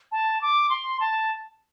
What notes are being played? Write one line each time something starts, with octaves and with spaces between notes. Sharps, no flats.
A5
D6
C6
A5